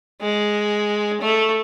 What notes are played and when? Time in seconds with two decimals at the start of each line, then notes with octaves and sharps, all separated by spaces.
0.22 G#3
1.21 A3